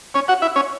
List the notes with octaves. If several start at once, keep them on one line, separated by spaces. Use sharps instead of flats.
C#4 C#5
F#4 F#5
E4 E5
C#4 C#5